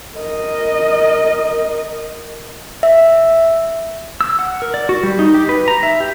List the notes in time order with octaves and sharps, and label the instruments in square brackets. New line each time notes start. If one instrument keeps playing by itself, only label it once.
[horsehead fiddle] A#4 D#5
[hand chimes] E5
[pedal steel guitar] E6
F#5
A#4
D5
F#4
G3
D#4
G4
B4
A#5
E5
G4